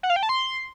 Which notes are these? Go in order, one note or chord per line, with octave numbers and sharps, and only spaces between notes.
F#5
F5
G5
A5
C6